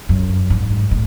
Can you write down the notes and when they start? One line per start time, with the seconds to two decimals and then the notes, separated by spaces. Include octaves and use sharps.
0.09 F#2
0.50 G#2
0.91 A2